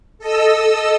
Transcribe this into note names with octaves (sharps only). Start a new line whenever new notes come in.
A4 D#5 E6